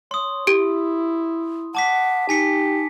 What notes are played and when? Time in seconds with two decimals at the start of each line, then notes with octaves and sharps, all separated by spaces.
0.11 C#5 C6 D#6
0.47 E4 G4 D7
1.75 F#5 A5 D6 B6
2.29 D#4 G4 G#5 B6 C#7